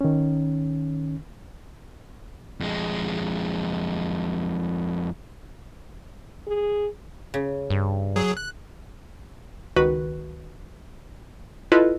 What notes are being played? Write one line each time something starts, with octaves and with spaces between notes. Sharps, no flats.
D#3 C#4
F2 G#3
G#4
C#3
G2
F#3 G#4
F#6
C#2 D#3 F#4 B4
E4 F4 A4 B4 D#5